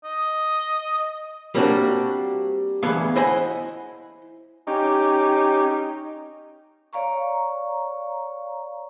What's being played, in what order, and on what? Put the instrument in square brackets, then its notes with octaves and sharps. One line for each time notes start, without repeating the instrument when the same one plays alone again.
[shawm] D#5
[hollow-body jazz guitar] G3 A#3 C4 D4 F#4
D2 E3 B3 G#4 F5
E4 C5 D#5 F#5 G#5 B5
[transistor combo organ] C#4 G4 [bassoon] D#4
[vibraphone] C#5 D5 F5 A#5 C#6